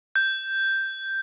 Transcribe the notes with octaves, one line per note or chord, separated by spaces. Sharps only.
G6